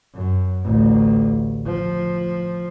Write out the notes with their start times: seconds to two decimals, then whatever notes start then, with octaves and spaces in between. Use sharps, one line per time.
0.14 F#2
0.65 A1 D2
1.65 F3